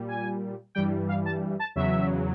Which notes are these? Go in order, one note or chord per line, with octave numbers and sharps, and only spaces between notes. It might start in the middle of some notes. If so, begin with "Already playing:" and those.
Already playing: A#2 G3
G#5
G2 E3 G3 G5
F5
A5
A5
E2 C#3 F#3 E5